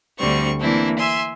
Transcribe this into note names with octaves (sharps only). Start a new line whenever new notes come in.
D2 D3 G3 C4 C#6
E3 A#3 C4 D4 E4
E5 G#5 C6